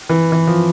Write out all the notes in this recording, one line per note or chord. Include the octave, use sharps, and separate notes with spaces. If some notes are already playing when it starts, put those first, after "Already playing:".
E3
E3
F3